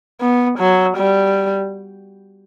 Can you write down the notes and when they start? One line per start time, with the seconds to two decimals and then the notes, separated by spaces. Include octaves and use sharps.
0.20 B3
0.59 F#3
0.97 G3